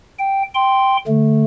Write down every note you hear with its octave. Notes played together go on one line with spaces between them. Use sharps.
G5
G5 C6
D3 A3